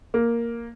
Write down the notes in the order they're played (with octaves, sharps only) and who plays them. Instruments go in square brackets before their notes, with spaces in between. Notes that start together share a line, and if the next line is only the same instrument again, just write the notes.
[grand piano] A#3